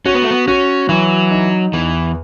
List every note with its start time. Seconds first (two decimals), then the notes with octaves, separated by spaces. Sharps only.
0.05 C#4 F#4
0.15 B3
0.22 A3
0.31 B3
0.48 C#4 F#4
0.89 E3 F#3
1.31 D#4
1.73 E2 E3